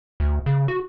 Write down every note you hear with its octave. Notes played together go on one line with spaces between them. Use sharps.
D2
C#3
F#4